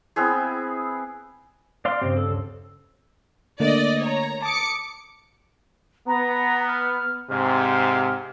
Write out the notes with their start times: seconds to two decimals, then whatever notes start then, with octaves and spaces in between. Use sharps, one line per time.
0.16 B3 C4 E4 G#4
1.85 D5 F5 C6 D6 F6
2.02 G2 C#3 C4 G4
2.17 A4
2.29 D2
3.60 D3 A3 A#3 D5 D#5
4.00 C#5 A#5
4.42 A5 D6 D#6 C#7
6.07 B3 A#5
6.67 F6
7.30 G#2 C3 F6